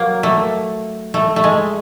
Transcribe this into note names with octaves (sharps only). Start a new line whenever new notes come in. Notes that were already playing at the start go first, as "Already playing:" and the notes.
Already playing: F#3 A#3
A3
A3
A3
G#3